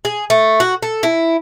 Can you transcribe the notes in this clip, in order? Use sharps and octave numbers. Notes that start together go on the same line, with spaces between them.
G#4
A3
F#4
A4
E4